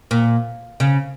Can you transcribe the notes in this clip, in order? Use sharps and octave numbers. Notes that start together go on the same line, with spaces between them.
A#2
C#3